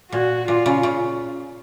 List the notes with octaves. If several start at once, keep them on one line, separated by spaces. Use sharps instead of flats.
A#2 F#4
A#2 F4
C#3
C#3